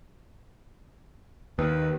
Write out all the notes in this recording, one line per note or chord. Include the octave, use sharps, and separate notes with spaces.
D#2 B4